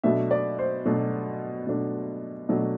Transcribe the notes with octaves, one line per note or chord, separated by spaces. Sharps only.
B2 F#3 A3 D4 E5
D5
C5
B2 F#3 A3 D4
B2 F#3 A3 D4
B2 F#3 A3 D4